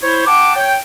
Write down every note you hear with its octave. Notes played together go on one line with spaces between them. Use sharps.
E4 C5 C#5
F#5 G5 A5 D6
C#5 G5